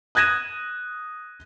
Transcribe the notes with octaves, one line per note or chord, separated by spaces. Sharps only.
D#6 F#6 G#6 A#6 D#7 E7